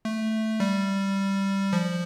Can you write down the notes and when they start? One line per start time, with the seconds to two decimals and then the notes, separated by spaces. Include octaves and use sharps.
0.05 A3
0.60 G3
1.73 F3